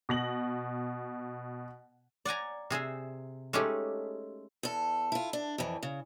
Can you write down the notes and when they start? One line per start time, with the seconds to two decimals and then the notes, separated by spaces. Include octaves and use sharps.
0.09 B2 A#6 F#7
2.25 D5 F#5 G#5 A#5
2.70 C3 G#4 C5 E5
3.53 G#3 A3 C#4 D#4 G4
4.63 E2 A4
5.12 E4 F4
5.33 D4
5.58 F2 E3
5.83 C#3